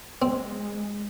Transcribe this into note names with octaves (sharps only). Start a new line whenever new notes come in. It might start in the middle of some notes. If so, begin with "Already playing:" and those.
G#3 C4